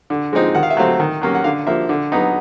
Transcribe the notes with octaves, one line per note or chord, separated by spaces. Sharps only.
D3
F3 G#3 C4 D#4
D#3 F#5
F5
E5
F#3 A3 C4 F5
D#3
F#3 A#3 C#4
F#5
D3 F5
F3 A#3 E5
D3
F#3 B3 D#4